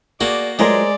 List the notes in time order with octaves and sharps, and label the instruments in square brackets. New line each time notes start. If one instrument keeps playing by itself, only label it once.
[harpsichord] A#3 F#4 [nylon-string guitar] G#4 [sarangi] D5
[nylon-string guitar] F#3 A3 F4 [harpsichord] G#3 [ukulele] G#4 A#4 C5 [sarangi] D5